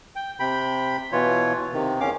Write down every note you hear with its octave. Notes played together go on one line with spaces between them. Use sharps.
G5
C3 G5 B5
B2 E3 F4 C#5
C3 D#3
E2 C#4 F5 D6